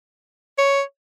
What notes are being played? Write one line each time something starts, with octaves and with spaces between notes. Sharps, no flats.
C#5